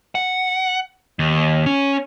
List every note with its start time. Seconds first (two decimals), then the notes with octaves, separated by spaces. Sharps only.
0.15 F#5
1.19 D#2
1.66 C#4